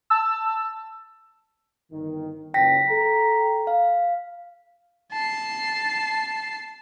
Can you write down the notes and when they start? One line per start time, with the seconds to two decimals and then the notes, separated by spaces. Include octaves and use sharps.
0.10 A5 E6
1.92 G1 D#3
2.54 F#1 C#2 G5 A#6 B6
2.90 A4 A#5
3.67 F5
5.12 A5 C7